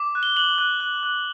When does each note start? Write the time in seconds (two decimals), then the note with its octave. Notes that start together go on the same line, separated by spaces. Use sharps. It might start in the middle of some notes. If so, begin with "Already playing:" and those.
Already playing: D6
0.15 F#6
0.23 G7
0.37 F#6 F#7
0.58 F#6
0.80 F#6
1.03 F#6